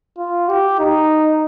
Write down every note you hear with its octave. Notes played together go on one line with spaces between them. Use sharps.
F4
G4
D#4